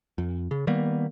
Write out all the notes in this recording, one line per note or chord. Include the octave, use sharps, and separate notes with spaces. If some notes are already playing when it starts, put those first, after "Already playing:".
F2
C#3
D#3 G3 A#3 B3